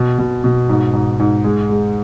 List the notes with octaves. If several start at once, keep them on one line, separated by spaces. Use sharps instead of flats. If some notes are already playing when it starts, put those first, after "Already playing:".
Already playing: B2
B2
B2
G#2
G#2
G#2
G#3
G#3